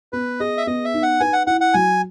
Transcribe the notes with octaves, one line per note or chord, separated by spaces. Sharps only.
B3 B4
G#4 D#5
E5
B3 D#5
E5
D#4
F#5
B4 G#5
F#5
E4 F#5
F#5
F#3 G#5